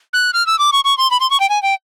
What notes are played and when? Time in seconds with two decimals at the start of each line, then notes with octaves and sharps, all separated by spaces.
0.13 F#6
0.33 F6
0.47 E6
0.59 D6
0.72 C#6
0.84 C#6
0.98 C6
1.11 B5
1.20 C6
1.30 C#6
1.40 G5
1.49 G#5
1.62 G5